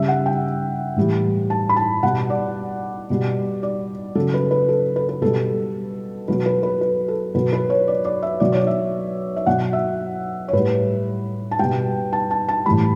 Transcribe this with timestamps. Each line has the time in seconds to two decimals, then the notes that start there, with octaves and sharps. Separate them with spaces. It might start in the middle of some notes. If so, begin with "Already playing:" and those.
Already playing: C#3 G3 E5
0.08 F#5
0.26 G5
0.96 A2 E3 G3
1.50 A5
1.69 B5
1.76 A5
2.03 B2 G3 F#5
2.30 D5
3.10 B2 G3
3.63 D5
4.15 C#3 F#3 A4
4.34 B4
4.51 B4
4.69 A4
4.96 B4
5.09 B4
5.21 B2 G3 A4
6.28 B2 F#3 B4
6.46 B4
6.63 B4
6.81 B4
7.08 A4
7.35 B2 F#3 B4
7.53 B4
7.70 C#5
7.88 D5
8.05 D5
8.22 E5
8.40 B2 F#3 D5
8.52 C#5
8.60 D5
8.67 E5
9.36 E5
9.46 B2 F#3 F#5
9.73 E5
10.48 C#5
10.53 A2 G3 B4
11.51 A5
11.59 B2 G3 G5
12.13 A5
12.31 A5
12.49 A5
12.66 A2 E3 G3 B5